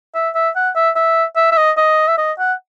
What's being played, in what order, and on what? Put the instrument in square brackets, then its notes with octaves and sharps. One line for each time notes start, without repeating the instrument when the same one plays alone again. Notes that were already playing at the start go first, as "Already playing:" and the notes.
[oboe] E5
E5
F#5
E5
E5
E5
E5
D#5
D#5
E5
D#5
F#5